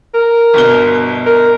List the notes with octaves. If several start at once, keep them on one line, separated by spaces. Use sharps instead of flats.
A#4
G1 B2 G7
A#4